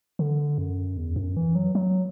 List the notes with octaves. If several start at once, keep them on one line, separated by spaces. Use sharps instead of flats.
D3
F#2
E2
F#2
E3
F#3
F#3